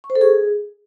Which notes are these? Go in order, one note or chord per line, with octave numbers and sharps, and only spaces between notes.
C#6
C5
A4
G#4